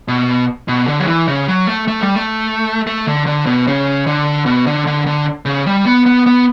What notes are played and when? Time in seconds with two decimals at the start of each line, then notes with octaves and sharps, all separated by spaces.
0.08 B2
0.68 B2
0.87 D3
1.00 F#3
1.07 E3
1.28 C#3
1.48 F#3
1.67 A3
1.88 A3
2.01 G3
2.16 A3
2.87 A3
3.07 D3
3.26 D3
3.46 B2
3.67 C#3
4.07 D3
4.46 B2
4.67 D3
4.87 D3
5.07 D3
5.45 C#3
5.66 G3
5.85 B3
6.06 B3
6.26 B3